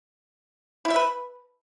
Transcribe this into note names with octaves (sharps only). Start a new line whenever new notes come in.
E4
E5
B4